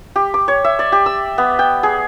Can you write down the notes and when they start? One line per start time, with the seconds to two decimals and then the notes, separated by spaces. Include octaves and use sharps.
0.16 G4
0.34 D6
0.48 C#5
0.64 E5
0.79 D5
0.92 G4
1.06 E6
1.38 B3
1.59 G5
1.83 G#4